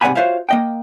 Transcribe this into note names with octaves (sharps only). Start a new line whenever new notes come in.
G#2 C3 D5 F#5 G#5 B5
F4 F#4 C5 C#5 E5 F5
A#3 D#5 G5